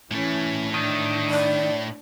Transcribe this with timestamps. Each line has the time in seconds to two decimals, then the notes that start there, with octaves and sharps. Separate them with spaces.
0.11 A2 E3 A3 C#4
0.74 D#3 D4
1.30 D5